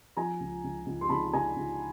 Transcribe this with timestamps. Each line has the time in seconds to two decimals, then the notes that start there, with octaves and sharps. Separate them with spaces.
0.17 F3 G#5 A#5
0.40 C#2
0.64 C#2
0.86 C#2
1.01 C6
1.09 C#2 A5 B5
1.33 C#2 G#5 A#5
1.56 C#2